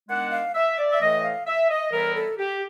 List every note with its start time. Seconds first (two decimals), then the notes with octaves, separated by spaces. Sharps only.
0.09 D#3 G#3 B3 D4 F#5
0.32 F5
0.55 E5
0.78 D5
0.92 E5
1.01 A2 E3 A3 D#5
1.23 F5
1.47 E5
1.70 D#5
1.92 A2 E3 G3 B3 E4 A#4
2.15 A4
2.38 G4